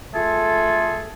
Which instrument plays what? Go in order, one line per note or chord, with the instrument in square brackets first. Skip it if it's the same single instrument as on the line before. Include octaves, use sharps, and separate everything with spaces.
[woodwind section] A3 F4 G#4 A4